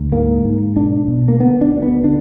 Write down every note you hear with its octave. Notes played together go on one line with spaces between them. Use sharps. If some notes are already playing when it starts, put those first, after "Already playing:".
Already playing: D2
G#2 A#3
G#2
B1 D4
B2
A#3
D3 B3
D4
D2
B3
D3 D4